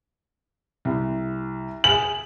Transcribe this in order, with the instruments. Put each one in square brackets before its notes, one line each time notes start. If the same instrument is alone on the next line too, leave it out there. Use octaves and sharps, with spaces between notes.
[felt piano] C2
[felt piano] G#4 G#5 [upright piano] F#7